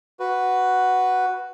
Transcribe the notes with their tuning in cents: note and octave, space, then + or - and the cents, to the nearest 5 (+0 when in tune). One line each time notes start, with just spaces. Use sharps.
F#4 +0 B4 +0